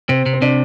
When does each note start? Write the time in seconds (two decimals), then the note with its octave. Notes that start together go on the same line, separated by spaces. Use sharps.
0.09 C3 C4
0.26 C3
0.33 C4
0.42 C3 D4